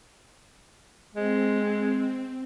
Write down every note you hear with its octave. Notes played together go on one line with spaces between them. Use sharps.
G#3 C4